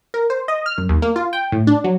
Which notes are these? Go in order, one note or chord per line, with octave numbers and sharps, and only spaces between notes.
A#4
C5
D#5
F6
F#2
D#2
A#3
F4
G5
A2
D4
F#3